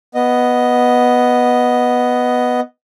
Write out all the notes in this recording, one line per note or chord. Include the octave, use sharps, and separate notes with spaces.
B3 D#5